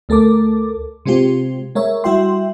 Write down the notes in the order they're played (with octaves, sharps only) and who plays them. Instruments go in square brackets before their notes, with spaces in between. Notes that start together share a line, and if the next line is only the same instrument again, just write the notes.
[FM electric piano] D2 A3 A4 A#4 D6
C3 G#3 C4 F4 G4
G#3 A#4 C#5 E5
G3 E4 F#4 E5 G5 C6